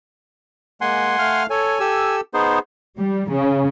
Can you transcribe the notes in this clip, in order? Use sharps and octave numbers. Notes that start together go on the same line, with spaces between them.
G#3 A#3 F#5 G#5 C6
A3 F5 F6
A4 C#5 G#5
G4 A4 E6
B3 D#4 G#4 C5
G3
C#3